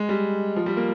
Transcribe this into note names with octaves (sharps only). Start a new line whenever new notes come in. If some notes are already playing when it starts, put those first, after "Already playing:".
Already playing: G#3
G3
F3
G3
A#3